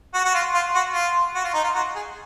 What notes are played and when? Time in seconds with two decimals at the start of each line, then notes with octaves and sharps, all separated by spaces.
0.14 F#4
0.25 F#4
0.34 F4
0.54 F4
0.75 F#4
0.94 F4
1.35 F#4
1.44 F4
1.54 D#4
1.64 F4
1.75 F#4
1.95 G#4